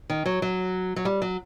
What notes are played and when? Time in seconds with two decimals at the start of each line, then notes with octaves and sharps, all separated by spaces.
0.10 D#3
0.26 F#3
0.42 F#3
0.96 F#3
1.05 G3
1.22 F#3